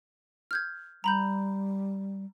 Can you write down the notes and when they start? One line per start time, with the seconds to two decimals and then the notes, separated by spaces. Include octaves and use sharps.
0.51 F6 G6 G#6
1.04 G3 A#5 B5 G6